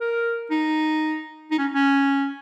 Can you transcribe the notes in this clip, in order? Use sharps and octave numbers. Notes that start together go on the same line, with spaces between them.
A#4
D#4
D#4
C#4
C#4